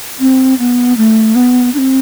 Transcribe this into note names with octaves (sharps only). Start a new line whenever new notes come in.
C4
B3
A3
B3
D4
C4